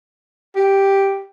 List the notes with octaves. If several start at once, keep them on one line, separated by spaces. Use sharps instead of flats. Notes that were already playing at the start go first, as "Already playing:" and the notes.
G4